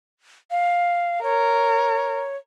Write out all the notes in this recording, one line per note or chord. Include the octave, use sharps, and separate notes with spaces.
F5
A#4 C#5